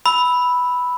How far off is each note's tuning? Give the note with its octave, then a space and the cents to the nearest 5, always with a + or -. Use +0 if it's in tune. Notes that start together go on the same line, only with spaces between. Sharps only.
B5 +0 E6 -10